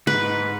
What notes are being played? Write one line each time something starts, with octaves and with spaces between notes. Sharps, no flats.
G#2 B4